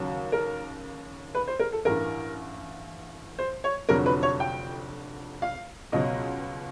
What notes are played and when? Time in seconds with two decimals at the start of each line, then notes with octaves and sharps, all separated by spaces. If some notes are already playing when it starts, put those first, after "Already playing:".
Already playing: D#2 C#3 F#3
0.32 A#4
1.35 B4
1.48 C5
1.60 A#4
1.72 A4
1.85 A1 G2 E3 A#4
3.39 C5
3.64 C#5
3.89 F1 F2 D3 F#3 A#4
4.06 B4
4.23 C#5
4.40 G5
5.42 F5
5.92 C#2 B2 F#3 D#5